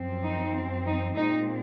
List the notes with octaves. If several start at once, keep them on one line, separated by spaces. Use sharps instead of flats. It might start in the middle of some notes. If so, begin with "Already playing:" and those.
Already playing: F#2 F3 C4
D#4
D#4
A#2 G#3 C4 D#4